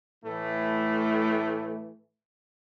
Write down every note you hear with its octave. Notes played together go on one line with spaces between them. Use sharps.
A2 E3 A3